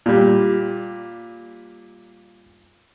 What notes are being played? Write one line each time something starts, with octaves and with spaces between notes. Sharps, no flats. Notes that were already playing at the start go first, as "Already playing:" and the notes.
A#2 G3